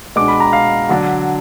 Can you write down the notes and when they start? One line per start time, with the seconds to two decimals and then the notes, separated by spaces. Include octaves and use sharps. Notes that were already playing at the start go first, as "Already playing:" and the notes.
0.16 B2 G#3 D4 D6
0.28 B5
0.40 A#5
0.53 F5
0.89 D3 F#3 D4